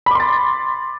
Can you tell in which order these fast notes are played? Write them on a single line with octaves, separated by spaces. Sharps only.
B5 D6 C6 A6